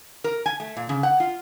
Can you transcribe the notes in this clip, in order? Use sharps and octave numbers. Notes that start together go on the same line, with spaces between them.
A#4
G#5
A3
A#2
C#3
F#5
F4